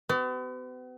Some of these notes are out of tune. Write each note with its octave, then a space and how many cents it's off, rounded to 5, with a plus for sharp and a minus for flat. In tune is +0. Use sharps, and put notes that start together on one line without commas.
B3 +40 F#4 +45